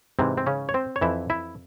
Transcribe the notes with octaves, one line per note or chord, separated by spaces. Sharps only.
G#2 C3 E3 C4
C4
C#3 C#4
C#5
C4 C5
C#5
F2 E3 E4 E5
E4 E5